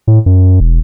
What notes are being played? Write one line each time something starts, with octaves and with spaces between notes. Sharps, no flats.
A2
F#2
E1